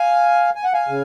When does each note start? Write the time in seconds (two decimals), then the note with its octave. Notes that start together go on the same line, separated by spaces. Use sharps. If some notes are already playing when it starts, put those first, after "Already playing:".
Already playing: F5 G#5
0.55 G#5
0.64 F#5
0.73 F5 G#5
0.88 C#3